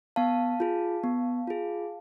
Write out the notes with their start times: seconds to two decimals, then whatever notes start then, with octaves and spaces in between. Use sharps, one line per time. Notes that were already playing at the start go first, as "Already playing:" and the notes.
0.16 B3 F5 A5
0.60 F4 G#4
1.04 B3
1.47 F4 G#4